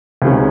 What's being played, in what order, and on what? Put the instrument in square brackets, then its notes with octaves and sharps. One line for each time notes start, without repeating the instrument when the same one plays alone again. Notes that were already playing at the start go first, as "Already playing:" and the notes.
[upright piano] C#2 C3 D#3 G#3 C#4